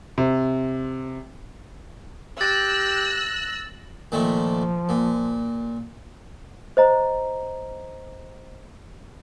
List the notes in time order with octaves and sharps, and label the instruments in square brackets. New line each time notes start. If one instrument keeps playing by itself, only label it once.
[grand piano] C3
[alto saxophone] G4 [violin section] E6 F#6 [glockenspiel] A6 [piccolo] A#6
[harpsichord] A#2 D#3 A3 [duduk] F3
[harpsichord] A#2
[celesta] C5 D#5 A#5